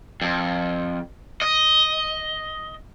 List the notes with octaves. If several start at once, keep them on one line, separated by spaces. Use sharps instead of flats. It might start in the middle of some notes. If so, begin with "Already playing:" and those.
F2
D#5